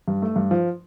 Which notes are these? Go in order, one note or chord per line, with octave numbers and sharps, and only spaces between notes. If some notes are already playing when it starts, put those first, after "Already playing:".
G2
A3
G2
F3